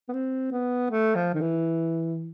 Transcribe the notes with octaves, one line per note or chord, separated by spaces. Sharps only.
B3
C4
B3
A3
F3
D#3
E3